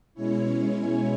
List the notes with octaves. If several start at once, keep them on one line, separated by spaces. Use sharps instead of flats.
B2 G#3 C#4 E4 C#5